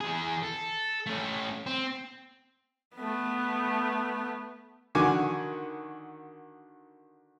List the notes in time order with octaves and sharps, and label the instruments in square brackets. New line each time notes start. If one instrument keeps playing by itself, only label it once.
[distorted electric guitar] E3 G#4
A4
A3 C#4
C4
[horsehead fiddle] A3 B3
[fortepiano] D3 D#3 F#4 G#5 D6